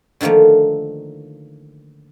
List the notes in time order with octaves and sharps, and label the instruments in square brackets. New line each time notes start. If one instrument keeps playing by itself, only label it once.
[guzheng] D3 D#3 F3 A3 A#3